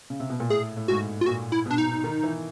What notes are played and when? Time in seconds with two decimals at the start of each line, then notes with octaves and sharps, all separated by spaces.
0.10 C#3
0.20 C3
0.30 B2
0.40 A#2
0.49 A2 G#4
0.77 A2
0.88 G#2 F#4
1.21 F4
1.26 A#2 F#4
1.52 E4
1.66 B2 D4
1.78 D#4
2.04 D#3
2.23 E3